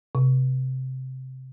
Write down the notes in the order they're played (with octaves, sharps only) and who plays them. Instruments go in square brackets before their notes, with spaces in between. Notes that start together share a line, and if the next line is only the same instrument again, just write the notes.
[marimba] C3